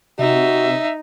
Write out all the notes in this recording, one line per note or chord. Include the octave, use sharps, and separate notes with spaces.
C3 D#4 F#4 E5